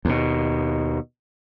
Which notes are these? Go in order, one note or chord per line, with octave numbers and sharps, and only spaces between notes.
D#2 B2